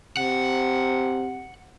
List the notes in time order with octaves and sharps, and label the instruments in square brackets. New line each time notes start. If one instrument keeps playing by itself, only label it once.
[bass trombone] C3 [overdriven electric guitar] F#5